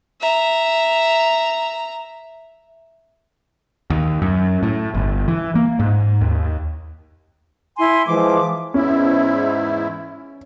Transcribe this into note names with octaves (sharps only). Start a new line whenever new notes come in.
E5 A#5
D#2
F#2
A2
G1
E3
A#3
G#2
D#2
E4 G#5 C6
E3 F3 G#3 D6
E2 G#2 C#4 E4